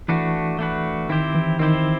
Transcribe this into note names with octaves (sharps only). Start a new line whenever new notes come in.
E3 A3 D4 F#4 B4
A3 D4 F#4 B4
D#3 C4 E4 G4 C5
E3
D#3 C4 E4 G4 C5